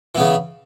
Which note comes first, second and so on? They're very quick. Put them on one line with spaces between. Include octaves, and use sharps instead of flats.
E3 B3 C#3